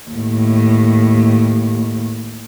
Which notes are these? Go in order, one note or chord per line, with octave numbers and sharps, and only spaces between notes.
D#2 A2